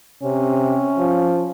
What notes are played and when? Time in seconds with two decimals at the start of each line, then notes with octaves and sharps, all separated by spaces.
0.23 C3 C#4
0.98 F3